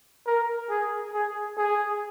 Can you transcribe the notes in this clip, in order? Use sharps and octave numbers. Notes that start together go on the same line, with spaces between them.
A#4
G#4
G#4
G#4